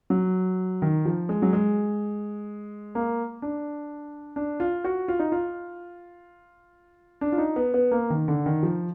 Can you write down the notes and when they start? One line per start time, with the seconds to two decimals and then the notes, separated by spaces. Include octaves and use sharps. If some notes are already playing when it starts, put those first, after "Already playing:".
0.10 F#3
0.82 D#3
1.05 F3
1.29 G#3
1.42 F#3
1.53 G#3
2.95 A#3
3.42 D4
4.36 D4
4.60 F4
4.84 F#4
5.08 F4
5.19 D#4
5.32 F4
7.21 D4
7.32 F4
7.38 D#4
7.56 B3
7.74 B3
7.91 A#3
8.10 D#3
8.28 D3
8.46 D#3
8.63 F3